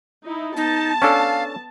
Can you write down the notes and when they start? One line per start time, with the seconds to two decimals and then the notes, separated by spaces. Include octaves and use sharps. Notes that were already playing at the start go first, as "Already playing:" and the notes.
0.24 D#4 E4
0.57 B3 D#4 A5
1.02 C#4 D4 A4 F5